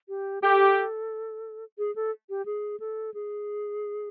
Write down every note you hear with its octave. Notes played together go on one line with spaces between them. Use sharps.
G4
G4 A4
G#4
A4
G4
G#4
A4
G#4